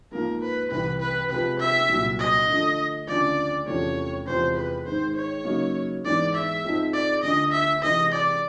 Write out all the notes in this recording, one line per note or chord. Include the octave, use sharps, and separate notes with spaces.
G#2 F3 A#3 A#4
B4
C2 C3 E3 B4
B4
C3 F3 G#3 B4
E5
C2 A#2 F#3
D#5
D3 F3 A3
D2 C#3 F3 D5
E2 C3 F3 A3 C#4 C#5
E2 C3 F3 G#3 C4 C5
B4
G#2 D#3 G#3 C5
C#5
C#3 F#3 A#3 D#4
G#2 E3 G#3 B3 D5
E5
G#2 F3 G#3 C4 D#4
D5
D2 D3 F3 D#5
E5
C3 E3 G#3 D#5
D5